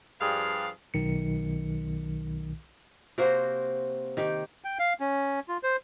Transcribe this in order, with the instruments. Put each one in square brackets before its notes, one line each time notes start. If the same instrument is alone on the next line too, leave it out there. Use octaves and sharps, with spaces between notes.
[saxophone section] G2 F3 G3 G#4 F5
[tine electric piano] B1 D#3 C#7
[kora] C3 A#3 F#4 C5
D#3 G4
[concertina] G5
F5
C#4
F4
C5